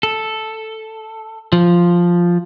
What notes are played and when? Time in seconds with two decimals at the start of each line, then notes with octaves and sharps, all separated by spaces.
0.03 A4
1.53 F3